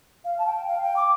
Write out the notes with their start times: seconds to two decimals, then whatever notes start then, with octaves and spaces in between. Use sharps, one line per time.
0.24 F5
0.38 A5
0.46 G5
0.68 F5
0.82 G5
0.96 D6